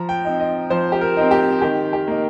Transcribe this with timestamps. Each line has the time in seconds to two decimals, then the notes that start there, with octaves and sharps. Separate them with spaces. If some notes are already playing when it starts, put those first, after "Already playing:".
Already playing: F3 A#5
0.09 G5
0.25 C4 D#4
0.40 D#5
0.70 F3 C5
0.92 G4
1.01 A#4
1.17 C4 D#4
1.31 G4
1.62 D#3 G4
1.93 G4
2.07 A#3 D#4